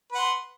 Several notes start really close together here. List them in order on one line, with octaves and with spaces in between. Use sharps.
B4 F#5 C6